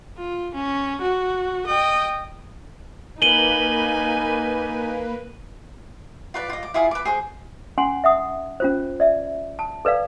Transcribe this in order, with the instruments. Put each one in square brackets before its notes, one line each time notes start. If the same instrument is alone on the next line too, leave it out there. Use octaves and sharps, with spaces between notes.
[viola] F4
C#4
F#4
D#5 G5
[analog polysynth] A#3 B4 [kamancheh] D#4 G#5 [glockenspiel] D#7 F#7 G7
[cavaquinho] F4 B4 D5
F4 D#5
D6
E4 F4 G#4 F5
B4 D6
G#4 C5
[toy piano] C#4 F#5 G#5 C6
E5 F#5 D#6
C#4 F4 C5
D5 E5
A5
A4 B4 D5 F5